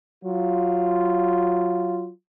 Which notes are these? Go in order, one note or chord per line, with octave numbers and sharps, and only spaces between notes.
F#3 F4